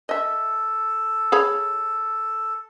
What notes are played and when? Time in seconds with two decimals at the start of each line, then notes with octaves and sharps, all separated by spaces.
0.09 A4 D#5 E5
1.32 G#4 C#5 B5